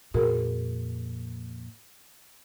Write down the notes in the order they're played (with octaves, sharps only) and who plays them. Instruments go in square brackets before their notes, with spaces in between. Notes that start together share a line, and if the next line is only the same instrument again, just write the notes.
[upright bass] F2 A#2 [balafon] F#4 G#4 A#4